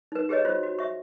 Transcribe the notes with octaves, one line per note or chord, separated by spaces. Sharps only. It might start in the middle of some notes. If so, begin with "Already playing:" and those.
D#4 B4
G4 G#4 B4 C#5 D#5
F4 F#4 C5
F#4
E5 C#6